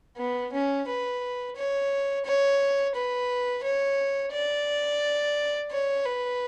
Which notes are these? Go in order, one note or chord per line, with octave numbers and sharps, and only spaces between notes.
B3
C#4
B4
C#5
C#5
B4
C#5
D5
C#5
B4